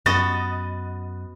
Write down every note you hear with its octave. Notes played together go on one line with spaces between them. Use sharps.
F#2 B3 F#4 D#5 A6